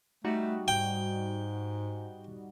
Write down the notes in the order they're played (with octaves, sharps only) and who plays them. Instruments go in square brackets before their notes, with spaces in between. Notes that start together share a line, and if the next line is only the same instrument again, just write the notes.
[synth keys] G3 D#4 F#4 [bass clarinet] A3
[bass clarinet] G#2 [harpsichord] G5